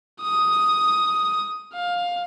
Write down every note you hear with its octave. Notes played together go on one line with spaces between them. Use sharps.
D#6
F5